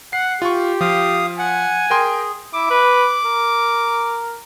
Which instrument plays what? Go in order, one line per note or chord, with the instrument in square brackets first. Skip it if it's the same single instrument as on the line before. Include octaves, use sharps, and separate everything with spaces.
[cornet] F#5 [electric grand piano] C7
[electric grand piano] F4 C#6 [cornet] G4
[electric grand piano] F3 [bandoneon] F5 D#6
[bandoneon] F#5 [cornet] G#5
[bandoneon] G#4 [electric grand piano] A#4 G5 C6
[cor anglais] E4 [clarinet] D6
[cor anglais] B4
A#4